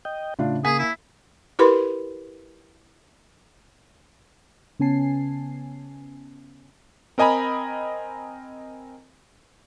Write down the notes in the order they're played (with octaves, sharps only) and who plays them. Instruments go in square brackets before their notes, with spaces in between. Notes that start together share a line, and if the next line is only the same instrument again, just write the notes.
[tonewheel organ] D#5 G5
[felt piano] A2 D4 F4 [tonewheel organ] C#3
[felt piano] A#3 G#5 B6 [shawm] G#4
[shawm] E4
[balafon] E4 G4 A#4 B4 B5 C6
[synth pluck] C#3 B3 C#4 G#5 A5 C7
[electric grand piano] C4 A#4 D#5 G#5 A#5 B5